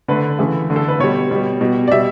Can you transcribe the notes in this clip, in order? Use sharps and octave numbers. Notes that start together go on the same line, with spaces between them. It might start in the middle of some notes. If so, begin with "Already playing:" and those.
D3 A3 B4
C#3 E3 A3
D3 A3
A4
B4
B2 G3 C#5
B2 G3
B2 G3
D5
B2 G3 E5